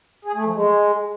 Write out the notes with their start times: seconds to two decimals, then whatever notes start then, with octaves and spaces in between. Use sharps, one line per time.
0.25 G#4
0.35 A3
0.45 F3
0.55 G#3